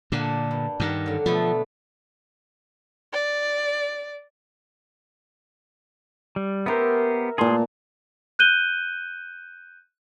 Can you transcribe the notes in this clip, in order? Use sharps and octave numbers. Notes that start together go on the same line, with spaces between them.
A#2 D3 A#3 D4 F#5
G2
G2 D#3 G4 A#4 F#5
D3 F#3
B2 F3 A3 A4
D5
G3
B3 G4 A#4 C5 E5
A#2 G#4 A5 C6
F#6 G6 D#7 G7